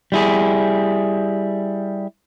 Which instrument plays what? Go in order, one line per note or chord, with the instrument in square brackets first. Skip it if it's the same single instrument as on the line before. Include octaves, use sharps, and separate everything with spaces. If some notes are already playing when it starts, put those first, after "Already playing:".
[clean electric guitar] G3 E4 G#4